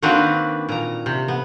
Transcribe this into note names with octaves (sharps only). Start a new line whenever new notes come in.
D#3 A#3 C4 D4 F#4 B4
A#2 A#5
C3
B3